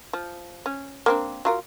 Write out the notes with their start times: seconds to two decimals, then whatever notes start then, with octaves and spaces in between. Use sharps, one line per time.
0.13 F3
0.66 C#4
1.06 A#3 C4 D4
1.45 F#3 F4 A#4